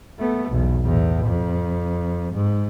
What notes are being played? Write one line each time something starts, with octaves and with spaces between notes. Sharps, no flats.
A3 B3
B1 E2
E2 A2
F2
G#2